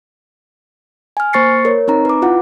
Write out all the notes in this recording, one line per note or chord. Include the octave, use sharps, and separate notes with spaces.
G#5 F6
A#3 C5 C#6 A6 C7 C#7
A#4 C#5
C4 D#4 A#5
B4 D6
E4 F4 F#5